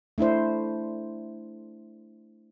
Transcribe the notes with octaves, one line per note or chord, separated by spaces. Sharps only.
A3 D4 E4 C5